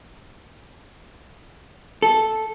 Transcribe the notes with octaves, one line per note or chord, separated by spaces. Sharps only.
A4